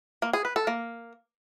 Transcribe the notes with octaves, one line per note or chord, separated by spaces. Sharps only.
A#3
G#4
B4
A4
A#3